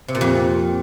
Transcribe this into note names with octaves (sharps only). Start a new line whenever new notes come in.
C3
A#2
F2